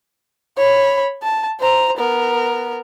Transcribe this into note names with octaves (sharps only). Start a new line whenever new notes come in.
C#5 B5
A5
C5 A#5
B3 A#4